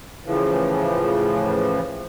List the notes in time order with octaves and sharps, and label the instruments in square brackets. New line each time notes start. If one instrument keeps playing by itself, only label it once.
[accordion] A2 C#3 E3 F3